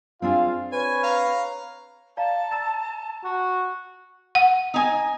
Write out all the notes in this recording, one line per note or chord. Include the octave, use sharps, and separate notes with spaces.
C4 D4 F4 G#4 F5
B4 C#5 G#5
F5 A#5
D5 F5 A5 A#5
A#5 E6 A6
F#4
F#5
D#4 G#5